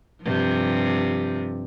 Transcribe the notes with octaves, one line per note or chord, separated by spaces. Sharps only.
G2 C3 F3